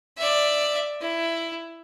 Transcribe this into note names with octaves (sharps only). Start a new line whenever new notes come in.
D5 E5
E4